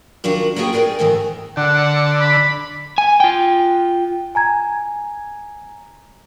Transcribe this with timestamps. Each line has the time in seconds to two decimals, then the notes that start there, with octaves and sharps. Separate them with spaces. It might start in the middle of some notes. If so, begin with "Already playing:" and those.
0.24 D#3 D4 F4 F#4 A#4
0.56 A#3 B3 F4 F#4 G#4 G5
0.73 G#4 A#4 B4 D5 G5
0.99 D2 G#2 D#3 E3 A#4
1.57 D3 F#5
2.21 B5
2.98 G#5
3.20 F4 G5
4.35 G#5 A#5 G#6